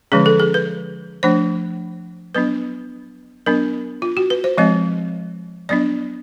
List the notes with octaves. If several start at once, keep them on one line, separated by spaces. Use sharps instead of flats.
D3 F3 G#3 C#4 G#4
A4
G#4
B4
F3 A3 D4 C5
F#3 B3 D4 B4
F#3 B3 D4 A#4
F4
F#4
B4
C5
F3 G#3 C4 D#5
F#3 B3 D4 D5